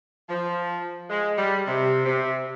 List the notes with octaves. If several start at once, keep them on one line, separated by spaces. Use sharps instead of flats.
F3
G#3
G3
C3
C3